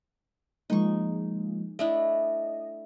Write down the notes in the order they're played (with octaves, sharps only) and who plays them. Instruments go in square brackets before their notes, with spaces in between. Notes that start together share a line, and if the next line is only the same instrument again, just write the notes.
[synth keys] F3 G#3 A#3 [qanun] D#4 C#6
[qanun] A3 D4 E4 [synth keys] D#5